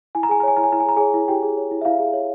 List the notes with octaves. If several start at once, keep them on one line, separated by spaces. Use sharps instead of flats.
E4 G#5
A#5
G#4 G#5
A#5
C#5 G#5
E4 A#5
G#5
E4 A#5
G#5
G#4
A#5
G#4 C#5 G#5
E4
E4 G4 G5
G#4
C#5
E4
E5
E4 F5
G#4
C#5